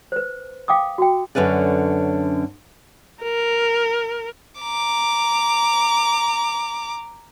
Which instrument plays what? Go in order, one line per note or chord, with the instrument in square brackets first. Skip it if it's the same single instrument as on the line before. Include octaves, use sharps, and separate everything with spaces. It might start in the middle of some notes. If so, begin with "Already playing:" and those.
[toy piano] B4 C5
F5 G5 D6 D#6
F#4 G5
[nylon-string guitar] F#2 D3 C#4 B4 D5
[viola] A#4
[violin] A#5 D6